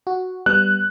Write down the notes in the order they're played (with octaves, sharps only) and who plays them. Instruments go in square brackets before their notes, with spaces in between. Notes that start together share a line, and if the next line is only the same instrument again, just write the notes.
[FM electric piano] F#4
[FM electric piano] G3 B3 [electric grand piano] F#6